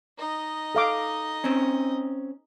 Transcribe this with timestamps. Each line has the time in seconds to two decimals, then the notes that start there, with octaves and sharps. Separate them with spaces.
0.18 D#4 D#5
0.75 A4 F5 D6
1.44 C4 C#4